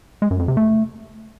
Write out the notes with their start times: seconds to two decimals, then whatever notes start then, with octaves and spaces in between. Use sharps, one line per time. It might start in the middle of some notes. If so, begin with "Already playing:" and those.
0.22 G#3
0.31 F#2
0.39 F2
0.48 C3
0.57 A3